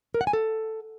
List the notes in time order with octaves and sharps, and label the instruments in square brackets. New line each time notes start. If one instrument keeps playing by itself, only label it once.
[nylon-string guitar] A#4
F#5
G#5
A4